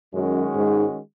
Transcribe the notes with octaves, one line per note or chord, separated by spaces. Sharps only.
F#2 D#3 G#3 C#4 F#4
G#2